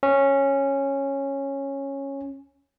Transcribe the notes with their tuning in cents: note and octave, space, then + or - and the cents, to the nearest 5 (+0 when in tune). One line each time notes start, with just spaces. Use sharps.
C#4 -10